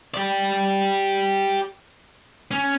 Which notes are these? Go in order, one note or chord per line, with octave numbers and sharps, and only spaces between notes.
G4 D5
C#4